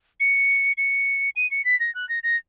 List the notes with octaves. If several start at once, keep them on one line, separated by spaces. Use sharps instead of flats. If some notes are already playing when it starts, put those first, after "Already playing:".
C#7
C#7
D#7
C#7
B6
A#6
F#6
A#6
A#6